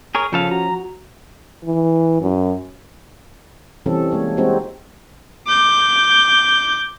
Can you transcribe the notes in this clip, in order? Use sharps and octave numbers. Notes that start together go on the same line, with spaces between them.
G#4 A#4 C#5
C#3 F3 C#4 A4 F5
F#4 A#5
E3
F#2
C3 E3 G3 C4 C#4 A4
G#3 A#3 C#5
G3 G#3 C4 D#4 F#4
D6 G6